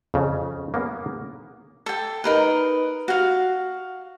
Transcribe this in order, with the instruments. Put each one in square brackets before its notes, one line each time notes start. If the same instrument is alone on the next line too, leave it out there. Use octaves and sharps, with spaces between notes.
[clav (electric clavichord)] F2 C#3
A#3 B3 C#4
[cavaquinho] A4 G5
D#4 A#4 B4
F#4 F5